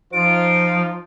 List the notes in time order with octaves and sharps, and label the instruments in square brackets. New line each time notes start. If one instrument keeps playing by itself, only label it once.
[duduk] F3 [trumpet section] D#4 F4 [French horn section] C5 [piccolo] D7